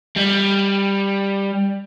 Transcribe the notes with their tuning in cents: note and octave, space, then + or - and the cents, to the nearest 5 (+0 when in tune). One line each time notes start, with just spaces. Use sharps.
G3 +10